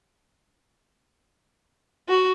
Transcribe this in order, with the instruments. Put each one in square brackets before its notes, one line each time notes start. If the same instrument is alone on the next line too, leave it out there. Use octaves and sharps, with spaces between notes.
[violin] F#4